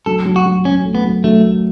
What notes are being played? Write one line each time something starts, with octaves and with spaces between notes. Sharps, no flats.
F#3 A4
F#3
F#4
F#3
F#3 C#4
A3
B3
F#3
F#3 A3
A3